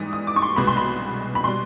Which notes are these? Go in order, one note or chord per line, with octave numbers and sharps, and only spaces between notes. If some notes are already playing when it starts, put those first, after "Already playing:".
Already playing: G#2 E3 G3 D#6
D#6
D6
C#6
C6
C2 B2 G#3 B3 B5
C6
B5
B5
B2 G3 C6